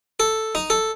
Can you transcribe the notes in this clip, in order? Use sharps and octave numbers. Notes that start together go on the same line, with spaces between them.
A4
D#4
A4